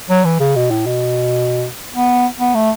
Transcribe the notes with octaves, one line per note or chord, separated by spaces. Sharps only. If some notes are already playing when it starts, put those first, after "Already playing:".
F#3
E3
C#3
B2
A2
B2
B3
B3
A3